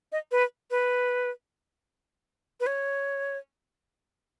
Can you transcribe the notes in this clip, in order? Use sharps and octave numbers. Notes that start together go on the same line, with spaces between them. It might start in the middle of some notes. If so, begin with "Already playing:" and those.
D#5
B4
B4
B4
C#5